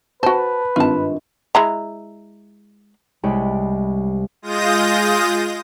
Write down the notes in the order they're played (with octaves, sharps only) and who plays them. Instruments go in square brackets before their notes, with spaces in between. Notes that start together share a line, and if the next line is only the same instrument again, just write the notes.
[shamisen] F#4 C5 [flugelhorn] B4 [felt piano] A5
[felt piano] G#1 G2 [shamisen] F4 A5
[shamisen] G#3 E4 A#5
[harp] C2 G#3 C#5 G5 B5
[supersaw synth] G#3 F4 D#6 G6 A#6